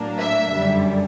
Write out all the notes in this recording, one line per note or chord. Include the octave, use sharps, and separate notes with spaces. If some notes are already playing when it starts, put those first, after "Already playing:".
Already playing: A2 F#3 A#3 D4
E5
F#2 D3 G3